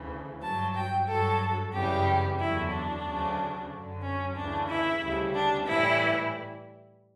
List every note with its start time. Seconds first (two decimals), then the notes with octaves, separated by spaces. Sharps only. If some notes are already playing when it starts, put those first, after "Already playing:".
Already playing: D2 C#3 E3
0.42 G2 F#3 A5
0.75 G5
1.07 G2 F#3 A4
1.73 F#2 C#3 E3 G3 G4
2.39 E2 D3 F#3 E4
2.71 D4
3.05 D2 C#3 F#3
3.70 F#2 D3 F#3
4.03 C#4
4.35 D2 C#3 E3 D4
4.69 E4
5.01 D2 C#3 G3
5.35 D4
5.67 A2 E3 G3 E4